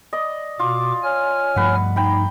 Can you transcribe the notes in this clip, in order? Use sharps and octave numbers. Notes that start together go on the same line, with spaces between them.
D5 D#5
B2 F4 D6
C#5 G#5 F6
G2 F3 A3 B4 F#5
D#4 G5 B5